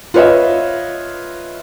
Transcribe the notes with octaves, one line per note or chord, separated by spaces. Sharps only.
F4 B4 C#5 D#5 E5